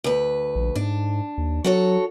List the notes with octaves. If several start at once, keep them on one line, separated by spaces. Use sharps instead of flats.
D2 B4
A#1
G#2 D4
D#2
F#3 F#4 A4 C#5